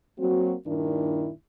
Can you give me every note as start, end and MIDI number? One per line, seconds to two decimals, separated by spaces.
0.18 0.53 54
0.18 0.53 58
0.18 0.53 60
0.18 0.53 66
0.65 1.30 43
0.65 1.30 46
0.65 1.30 51
0.65 1.30 62
0.65 1.30 64